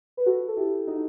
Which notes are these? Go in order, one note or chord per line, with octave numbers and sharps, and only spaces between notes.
B4
F#4 A4
A4
E4 G4
D#4 F#4